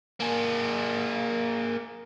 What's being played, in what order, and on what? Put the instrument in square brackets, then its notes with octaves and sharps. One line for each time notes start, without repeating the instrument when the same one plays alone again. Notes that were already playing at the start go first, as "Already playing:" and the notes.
[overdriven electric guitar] A#3 G#4